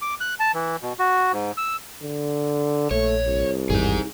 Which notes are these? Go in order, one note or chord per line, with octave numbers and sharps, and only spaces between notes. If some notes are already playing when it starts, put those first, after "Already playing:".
D6
F#6
A5
E3
B2
F#4
G#2
E6
D3
A#1 A3 C#5
C2
G#1 E2 G2 D#4 G#4